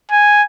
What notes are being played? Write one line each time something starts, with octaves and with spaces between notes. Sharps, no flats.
G#5